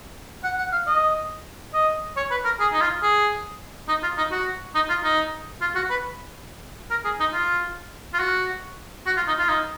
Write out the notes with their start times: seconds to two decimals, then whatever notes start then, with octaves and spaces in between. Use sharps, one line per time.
0.44 F#5
0.58 F#5
0.72 F5
0.87 D#5
1.74 D#5
2.17 C#5
2.31 B4
2.45 A#4
2.60 G#4
2.73 D#4
2.81 F4
3.02 G#4
3.88 D#4
4.03 F4
4.18 D#4
4.32 F#4
4.75 D#4
4.89 F4
5.03 D#4
5.61 F4
5.75 F#4
5.90 B4
6.91 A#4
7.05 G#4
7.20 D#4
7.33 F4
8.14 F4
8.19 F#4
9.06 F#4
9.17 F4
9.27 D#4
9.38 F4
9.49 D#4